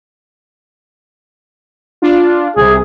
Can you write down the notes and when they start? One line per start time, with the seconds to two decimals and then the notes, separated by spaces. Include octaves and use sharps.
2.02 D4 F4
2.56 C2 C3 G#4